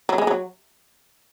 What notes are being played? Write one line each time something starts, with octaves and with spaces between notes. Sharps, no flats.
F#3
G#3
F#3